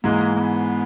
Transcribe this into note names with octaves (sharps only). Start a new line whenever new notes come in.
G#2 E3 G#3 A#3
A#3
B3